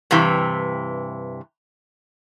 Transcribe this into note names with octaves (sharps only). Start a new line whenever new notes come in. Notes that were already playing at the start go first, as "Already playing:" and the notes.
G2 C3 E3